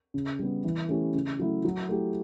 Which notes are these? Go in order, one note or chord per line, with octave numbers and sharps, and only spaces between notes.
C#3
G3 B3
E3
A3 C#4 E4 G4
C#3
F#3 A3 E4
F#3
A3 E4 G4